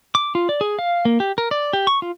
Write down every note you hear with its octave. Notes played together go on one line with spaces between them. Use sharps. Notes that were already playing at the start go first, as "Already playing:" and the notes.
D6
F4
D5
G#4
F5
A#3
G4
A#4
D5
G4
C#6
F4